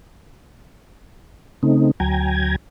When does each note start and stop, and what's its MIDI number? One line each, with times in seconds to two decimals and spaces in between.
1.63 1.91 49
1.63 1.91 57
1.63 1.91 60
1.63 1.91 63
2.00 2.56 38
2.00 2.56 54
2.00 2.56 79
2.00 2.56 80
2.00 2.56 82
2.00 2.56 92